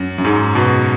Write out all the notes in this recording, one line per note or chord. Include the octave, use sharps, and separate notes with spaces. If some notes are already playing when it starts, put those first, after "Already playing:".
Already playing: F#2
F#2
G#2
B2